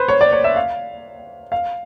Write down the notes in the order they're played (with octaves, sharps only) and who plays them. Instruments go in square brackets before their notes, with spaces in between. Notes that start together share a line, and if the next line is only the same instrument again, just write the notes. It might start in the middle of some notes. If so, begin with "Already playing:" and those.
Already playing: [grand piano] B4 C5
C#5
D5
C#5
E5
F5
F5